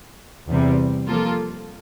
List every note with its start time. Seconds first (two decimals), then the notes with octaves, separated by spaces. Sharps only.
0.48 E2 C3 G3
1.07 F3 A#3 F4 A4